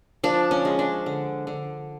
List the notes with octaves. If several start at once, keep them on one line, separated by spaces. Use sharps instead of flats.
F3 D4
C#4
G#3
D4
D3
D3